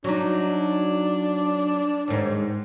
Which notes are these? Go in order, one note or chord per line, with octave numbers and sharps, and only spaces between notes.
F#3 D4 D#4
D#2 G#2